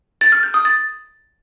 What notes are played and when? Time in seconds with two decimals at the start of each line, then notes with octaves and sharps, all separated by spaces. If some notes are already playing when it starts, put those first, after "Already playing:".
0.21 A6
0.32 F6
0.43 G6
0.54 D#6
0.65 A6